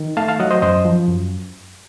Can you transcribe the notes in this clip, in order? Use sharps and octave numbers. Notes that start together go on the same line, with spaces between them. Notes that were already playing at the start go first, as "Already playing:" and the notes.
Already playing: D#3
A3 F5 A5
F5 A5
F#3 D#5 F#5
C5 D#5
F#2 C5 D#5
F3
F#2